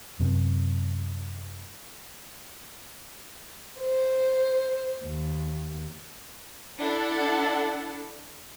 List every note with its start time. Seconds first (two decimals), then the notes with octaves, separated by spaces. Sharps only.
0.20 F#2 C3
3.80 C5
5.05 D#2
6.78 D4 E4 A4 F#5